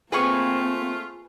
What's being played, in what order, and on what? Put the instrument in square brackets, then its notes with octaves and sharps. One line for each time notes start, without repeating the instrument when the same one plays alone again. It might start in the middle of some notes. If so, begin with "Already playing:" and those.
[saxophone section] A3 F4 [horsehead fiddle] A#3 C4 [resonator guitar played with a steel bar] G#4 [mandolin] B4 G#5 C#6